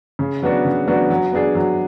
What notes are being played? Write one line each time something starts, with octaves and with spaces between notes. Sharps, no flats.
C#3
F#3 B3 D4 F#4
C#3
F#3 B3 D4 F#4
F#3
B3 D4 G#4
F#3